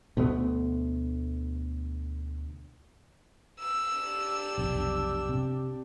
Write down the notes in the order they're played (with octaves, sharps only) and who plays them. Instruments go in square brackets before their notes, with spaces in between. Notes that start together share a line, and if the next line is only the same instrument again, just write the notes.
[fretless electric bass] D2 B2 A3 B3
[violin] E6
[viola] D4 G4
[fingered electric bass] F1 B1
C3